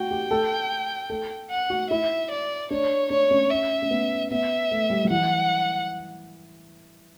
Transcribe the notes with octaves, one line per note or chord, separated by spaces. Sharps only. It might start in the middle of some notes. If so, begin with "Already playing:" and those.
Already playing: F#4 G5
G4
A4
A4
F#5
F#4
E4 E5
D5
D4 C#5
D4 C#5
C#4
E5
C#4
B3
B3 E5
A3
G3
F#3
E3 F#5